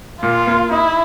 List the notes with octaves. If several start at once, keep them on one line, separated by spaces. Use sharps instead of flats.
A#2 F4
A#3
D#4 E4